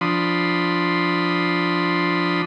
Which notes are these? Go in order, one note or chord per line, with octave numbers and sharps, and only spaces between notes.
F3 D4 B5 C6 D#6